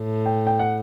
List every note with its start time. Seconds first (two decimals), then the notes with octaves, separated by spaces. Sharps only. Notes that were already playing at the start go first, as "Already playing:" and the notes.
Already playing: A2
0.26 G5
0.47 G5
0.59 F#5